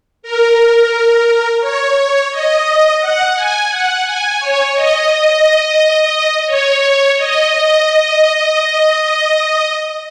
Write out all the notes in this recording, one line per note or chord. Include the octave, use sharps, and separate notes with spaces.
A#4
C#5
D#5
F#5
G#5
F#5
G#5
C#5
D#5
C#5
D#5